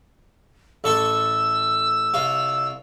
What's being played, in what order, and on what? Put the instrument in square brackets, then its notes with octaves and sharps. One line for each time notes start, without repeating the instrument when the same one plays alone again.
[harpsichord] A1 A4 C#6 [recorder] E6
[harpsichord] C2 F4